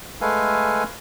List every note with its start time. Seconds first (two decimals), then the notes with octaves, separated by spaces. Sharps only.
0.21 G#3 A3 A4 B4 F5 G#5